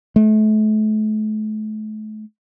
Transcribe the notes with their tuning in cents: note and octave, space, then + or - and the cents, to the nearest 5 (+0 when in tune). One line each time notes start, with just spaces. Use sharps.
A3 -35